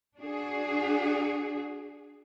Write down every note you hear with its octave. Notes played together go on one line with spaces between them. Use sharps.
D4 F#4 G#4